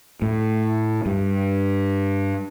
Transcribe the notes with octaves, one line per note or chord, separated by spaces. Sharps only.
A2
G2